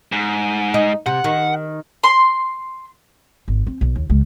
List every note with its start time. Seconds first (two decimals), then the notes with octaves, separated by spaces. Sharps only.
0.12 G#2
0.74 D#4
1.06 C3 F#5
1.24 D#3
2.04 C6
3.48 G#1
3.67 C4
3.81 B1
3.96 D#2
4.10 C#2 G#3